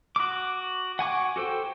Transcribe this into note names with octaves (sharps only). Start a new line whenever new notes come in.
F#4 D6
F#5 G#5 C#6 D6
F#4 A4 C5 G5